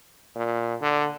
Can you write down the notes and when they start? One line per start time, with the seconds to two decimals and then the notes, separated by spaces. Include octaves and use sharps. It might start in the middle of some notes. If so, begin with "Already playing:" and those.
0.36 A#2
0.81 D3